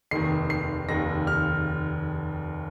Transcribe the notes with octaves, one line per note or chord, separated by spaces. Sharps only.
F1 D#2 D#3 C7
C7
F1 D#2 D#3 A#6
F6